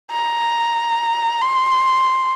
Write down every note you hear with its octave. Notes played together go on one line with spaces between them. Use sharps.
A#5
C6